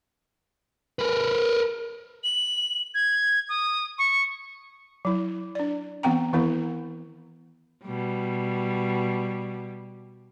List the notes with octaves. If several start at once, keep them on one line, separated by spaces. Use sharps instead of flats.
A#4 B4
F#7
G#6
D#6
C#6
F#3 E4
D4 D5
E3 B3 C4 G5 A#5
D#3 E3 B3 E4
B2 G3